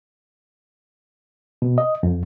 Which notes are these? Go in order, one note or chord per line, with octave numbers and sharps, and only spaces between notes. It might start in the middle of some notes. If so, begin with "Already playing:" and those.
B2
D#5
F2